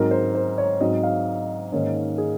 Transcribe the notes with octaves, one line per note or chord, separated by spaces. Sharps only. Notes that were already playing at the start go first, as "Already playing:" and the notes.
Already playing: G#2 F#3 C4 A#4
C5
C5
C#5
G#2 F#3 C4 D#5
F5
G#2 D#3 A#3 C#4
G#4